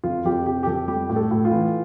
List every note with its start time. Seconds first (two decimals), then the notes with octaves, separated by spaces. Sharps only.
0.04 F2 F4
0.25 F2 G4
0.46 C3 G4
0.63 G4
0.66 F2 A4
0.88 G3 G4
1.10 A2
1.16 A4
1.31 A2
1.45 F4
1.51 E3